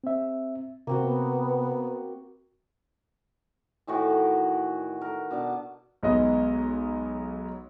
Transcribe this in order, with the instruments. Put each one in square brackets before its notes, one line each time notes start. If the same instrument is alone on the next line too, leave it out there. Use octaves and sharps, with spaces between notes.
[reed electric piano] C4 E5
[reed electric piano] C3 [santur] A#3 C4 F#4
[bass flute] B3
[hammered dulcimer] A2 D#3 E3 F#4
A#4
B2 D4 A5
[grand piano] B1 G#3 B3 D#5